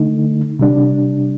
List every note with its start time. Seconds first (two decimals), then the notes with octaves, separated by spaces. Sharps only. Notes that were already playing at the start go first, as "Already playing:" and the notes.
Already playing: D3 A3 D#4
0.59 C3 G3 D4